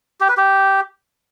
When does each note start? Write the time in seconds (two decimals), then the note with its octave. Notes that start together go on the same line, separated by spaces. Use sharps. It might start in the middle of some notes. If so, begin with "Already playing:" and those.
0.20 G4
0.29 B4
0.37 G4